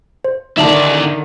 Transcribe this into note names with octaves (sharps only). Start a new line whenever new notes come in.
C5
D3 D#3 D#4 E4 D5 E5 A5